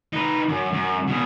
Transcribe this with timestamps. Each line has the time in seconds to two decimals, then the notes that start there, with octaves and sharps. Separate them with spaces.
0.13 D#4 B4
0.48 F#2
0.73 F#2
1.08 B2 G#4